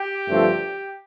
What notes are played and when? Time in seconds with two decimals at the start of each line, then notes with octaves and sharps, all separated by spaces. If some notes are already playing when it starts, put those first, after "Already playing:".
Already playing: G4
0.27 G2 D3 F3 A3 C4